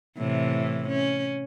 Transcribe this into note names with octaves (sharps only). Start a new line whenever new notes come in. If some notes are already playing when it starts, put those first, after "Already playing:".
A2 C3 E3
C#4